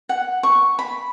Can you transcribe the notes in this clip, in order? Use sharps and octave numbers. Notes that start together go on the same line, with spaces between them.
F#5
C#6
B5